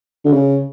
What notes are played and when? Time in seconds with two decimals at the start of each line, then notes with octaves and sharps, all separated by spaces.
0.25 D3
0.33 C#3